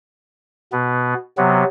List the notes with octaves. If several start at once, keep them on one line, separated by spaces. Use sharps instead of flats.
B2 B3
C3 F#3 B3